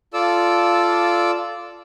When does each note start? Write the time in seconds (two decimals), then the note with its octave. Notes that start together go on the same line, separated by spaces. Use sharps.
0.14 F4 A4 D5 E6